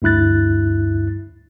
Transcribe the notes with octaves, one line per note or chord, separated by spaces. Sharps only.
D2 G2 E4 F#6 A6